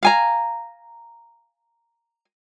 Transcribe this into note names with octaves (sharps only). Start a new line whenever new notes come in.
F5 G#5 A#5